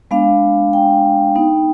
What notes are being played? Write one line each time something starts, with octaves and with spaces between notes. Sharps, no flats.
G#3 B3 D4 F5
G5
B3 D#4